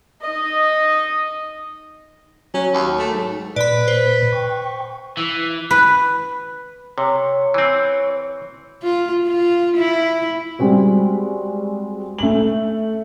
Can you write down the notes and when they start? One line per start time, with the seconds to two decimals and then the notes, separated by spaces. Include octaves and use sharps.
0.21 D#4 D#5
2.54 F#3 C#4
2.74 D#2
2.99 A3
3.14 G#2
3.56 A#2 B4 D5 B5
3.88 C5
4.32 G5 C#6
5.17 E3
5.71 B4
6.98 C3 C#5
7.54 E3 C4
8.83 F4
9.27 F4
9.77 E4
10.59 G3 G#3 C4 F#4
12.18 A3 F#7